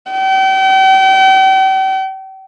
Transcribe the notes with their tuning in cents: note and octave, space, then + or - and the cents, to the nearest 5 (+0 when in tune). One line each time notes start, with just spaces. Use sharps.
G5 -40